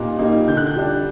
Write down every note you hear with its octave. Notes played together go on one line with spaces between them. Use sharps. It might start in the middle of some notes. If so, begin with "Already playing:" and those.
Already playing: A#2 G3 A#3 D#4 D6 F#6
G3 A#3 D#4
D3 G6
F#6
G6
G3 D4